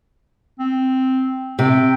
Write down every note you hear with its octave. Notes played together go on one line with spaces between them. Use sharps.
C4
C3 G5